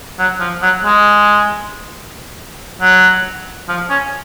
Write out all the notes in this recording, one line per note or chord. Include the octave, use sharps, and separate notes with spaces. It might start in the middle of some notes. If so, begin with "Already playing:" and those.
F#3
F3
F#3
G#3
F#3
F3
C#4